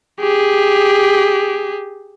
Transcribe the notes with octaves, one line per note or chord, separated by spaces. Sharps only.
G4 G#4